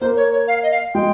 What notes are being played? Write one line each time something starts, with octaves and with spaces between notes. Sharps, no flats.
A#3 C5
C#5
C#5
F5
D#5
F5
G#3 G5